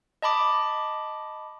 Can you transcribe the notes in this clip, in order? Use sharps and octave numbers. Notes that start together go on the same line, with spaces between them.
D#5 A5 B5 D6